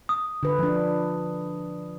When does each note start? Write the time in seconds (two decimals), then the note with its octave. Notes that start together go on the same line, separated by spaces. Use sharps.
0.09 D#6
0.43 D3 B4
0.59 F3 D4